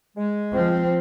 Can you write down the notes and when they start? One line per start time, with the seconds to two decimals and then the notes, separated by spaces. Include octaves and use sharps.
0.17 G#3
0.53 F3 C4